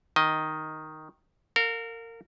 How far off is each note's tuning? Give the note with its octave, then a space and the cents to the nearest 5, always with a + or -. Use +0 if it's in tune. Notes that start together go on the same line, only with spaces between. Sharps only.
D#3 +0 D#5 +10
A#4 -25 F5 +35